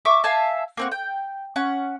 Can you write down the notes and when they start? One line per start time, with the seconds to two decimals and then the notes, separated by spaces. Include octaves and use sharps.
0.05 E5 C#6 D6 E6
0.24 E5 F5 G#5 A5
0.77 A#3 C4 F#4
0.92 G5
1.56 C#4 F#5